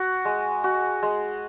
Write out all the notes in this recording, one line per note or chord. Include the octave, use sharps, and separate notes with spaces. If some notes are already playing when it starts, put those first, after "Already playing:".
Already playing: F#4
G#3
F#4
G#3